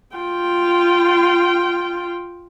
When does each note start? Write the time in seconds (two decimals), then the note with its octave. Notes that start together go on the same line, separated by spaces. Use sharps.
0.16 F4 G5